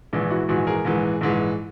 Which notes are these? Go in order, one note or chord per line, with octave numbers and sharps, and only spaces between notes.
A#1 G#2 E3 D4 E4
E4 F#4
A#1 G#2 E3 F#4 G#4
G#4 A#4
A#1 G#2 E3
A#1 G#2 E3